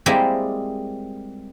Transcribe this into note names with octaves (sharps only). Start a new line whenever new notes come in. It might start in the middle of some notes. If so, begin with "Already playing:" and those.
G3 G#3 A#3 C4 E4 G4